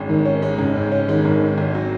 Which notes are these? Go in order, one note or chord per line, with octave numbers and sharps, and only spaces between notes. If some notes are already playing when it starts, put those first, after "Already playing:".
Already playing: G#1 G#3 C#4
G#2 D#3
C#4
G#3
G#1 C#3
G#2
C#4
D#3 G#3
G#1
G#2
G#1
F#3